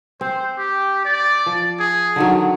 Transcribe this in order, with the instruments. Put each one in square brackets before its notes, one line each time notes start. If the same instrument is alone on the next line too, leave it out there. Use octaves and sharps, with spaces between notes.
[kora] C4 [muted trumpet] C5
[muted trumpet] G4
D5
[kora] F3
[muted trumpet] G#4
[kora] D3 D#3 F#3